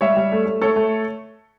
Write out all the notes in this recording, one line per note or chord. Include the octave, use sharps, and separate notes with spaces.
G3 C#5 E5
G3
A3
A3
A3 A4 C#5
A3